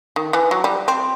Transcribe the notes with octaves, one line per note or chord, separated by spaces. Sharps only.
D#3
E3
F#3
G3
C4